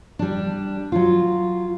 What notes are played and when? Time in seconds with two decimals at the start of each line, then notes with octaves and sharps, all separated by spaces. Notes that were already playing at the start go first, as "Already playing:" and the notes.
0.19 G3 D4
0.92 F#3 F4